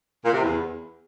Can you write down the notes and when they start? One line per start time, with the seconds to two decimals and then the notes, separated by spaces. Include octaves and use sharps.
0.24 A#2
0.33 C3
0.41 E2